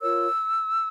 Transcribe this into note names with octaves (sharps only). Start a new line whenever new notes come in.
F4 A#4 C#5 E6